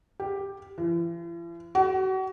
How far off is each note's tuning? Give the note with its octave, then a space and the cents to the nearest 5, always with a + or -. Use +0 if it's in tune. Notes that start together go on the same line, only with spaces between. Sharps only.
G4 +5
E3 +40
F#4 +35